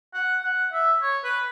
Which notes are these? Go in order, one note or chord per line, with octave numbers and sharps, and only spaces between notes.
F#5
F#5
E5
C#5
B4